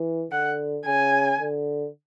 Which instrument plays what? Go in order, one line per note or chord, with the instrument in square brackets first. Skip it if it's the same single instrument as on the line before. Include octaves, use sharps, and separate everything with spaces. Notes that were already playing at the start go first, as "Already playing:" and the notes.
Already playing: [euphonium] E3
[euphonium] D3 [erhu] F#5
[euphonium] C#3 [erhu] G#5
[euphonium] D3